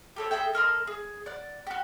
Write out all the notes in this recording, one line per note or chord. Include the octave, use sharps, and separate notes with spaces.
G4 A4 C#5
G#4 A4 E5 G5
A4 A#4 D#5 C6
G#4
D5 F#5
F#4 G4